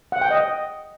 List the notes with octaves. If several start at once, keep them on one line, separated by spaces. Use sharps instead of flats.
F#5
G5
D#5